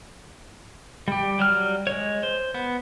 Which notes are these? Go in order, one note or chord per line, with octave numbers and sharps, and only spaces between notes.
G3 G4
F#3 G3 F6
G#3 C#5
C5
B3